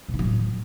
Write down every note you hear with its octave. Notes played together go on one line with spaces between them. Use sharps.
B2
D#3
F#3
A2